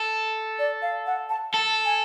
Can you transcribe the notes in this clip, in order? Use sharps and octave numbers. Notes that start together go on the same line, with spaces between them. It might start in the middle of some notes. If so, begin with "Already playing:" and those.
Already playing: A4
D5
F5
F#5
A5
A4 A5
G#5